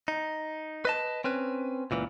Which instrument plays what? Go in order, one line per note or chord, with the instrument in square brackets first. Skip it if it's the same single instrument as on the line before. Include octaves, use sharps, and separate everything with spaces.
[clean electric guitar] D#4
B4 D#5 A5
C4 C#4 B4
C#2 A#2 E3